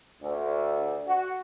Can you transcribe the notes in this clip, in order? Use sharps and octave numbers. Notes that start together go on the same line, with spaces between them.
D2
F#4